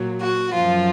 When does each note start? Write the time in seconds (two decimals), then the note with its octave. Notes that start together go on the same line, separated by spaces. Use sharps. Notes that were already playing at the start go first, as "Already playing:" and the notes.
Already playing: A#2 F#3
0.22 F#4
0.54 F#2 F3 F4